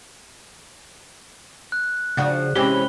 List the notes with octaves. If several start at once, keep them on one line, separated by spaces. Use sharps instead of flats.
F#6
C#3 F3 D4 F#4
C3 E3 G#3 C4 C#4 G4 B5 G7